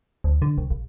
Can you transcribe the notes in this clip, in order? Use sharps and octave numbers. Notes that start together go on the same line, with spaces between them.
D2
D3
C2
A#1